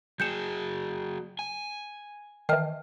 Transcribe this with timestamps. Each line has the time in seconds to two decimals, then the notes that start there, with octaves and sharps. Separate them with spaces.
0.20 F#3 G#4 G6 C#7 E7
1.39 G#5
2.49 D#3 E3 G5 A5 F6